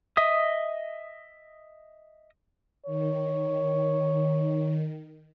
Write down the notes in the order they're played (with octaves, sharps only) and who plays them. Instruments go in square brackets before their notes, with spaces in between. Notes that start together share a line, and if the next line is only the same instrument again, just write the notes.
[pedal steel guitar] D#5 E5 D#6
[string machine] D#3 [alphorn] C#5